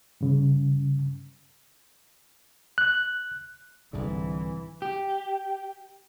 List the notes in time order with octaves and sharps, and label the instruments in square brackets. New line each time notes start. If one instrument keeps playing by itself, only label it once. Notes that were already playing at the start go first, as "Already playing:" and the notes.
[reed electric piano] G2 C#3
F#6
[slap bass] C2 G#2 D3 [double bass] E3
[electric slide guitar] G4